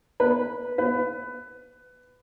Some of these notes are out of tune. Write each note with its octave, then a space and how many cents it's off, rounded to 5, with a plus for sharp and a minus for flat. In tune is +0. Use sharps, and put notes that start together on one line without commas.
B4 -5
B4 +20